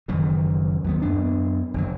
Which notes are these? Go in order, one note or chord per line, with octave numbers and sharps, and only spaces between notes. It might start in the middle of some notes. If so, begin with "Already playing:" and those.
F#1 F#2 D#3 E3
D#2 F#3 G#3 B3
F#2 B3 D4
F#1 D3 F#3